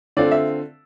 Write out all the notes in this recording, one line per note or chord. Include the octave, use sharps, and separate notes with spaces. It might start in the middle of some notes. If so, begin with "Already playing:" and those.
D3 A3 C4 F4 D5
E5